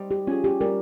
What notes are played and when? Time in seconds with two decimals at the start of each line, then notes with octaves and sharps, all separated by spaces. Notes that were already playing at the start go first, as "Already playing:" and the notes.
Already playing: G3 D#4 C5
0.11 G4
0.27 C#4 F4 G#4
0.44 G4
0.61 G3 A#4